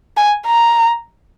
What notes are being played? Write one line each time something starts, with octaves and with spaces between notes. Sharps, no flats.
G#5
A#5